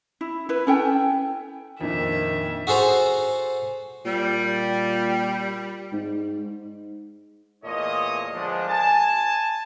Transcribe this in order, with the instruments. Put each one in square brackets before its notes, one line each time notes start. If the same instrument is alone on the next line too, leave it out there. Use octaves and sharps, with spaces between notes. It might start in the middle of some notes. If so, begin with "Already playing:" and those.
[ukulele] E4
E4 B4
C#4 A4 G5 G#5
[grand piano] F2 A#2 [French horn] D#3 [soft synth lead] D4 [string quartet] E5
[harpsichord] F#4 G#4 A4 C5 A#5
[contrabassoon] A#2 [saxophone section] G3
[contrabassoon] G#2
[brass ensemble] E2 A#2 A3 C#5 D#5
D3 F3 G#3 B3 D4
G#5 A5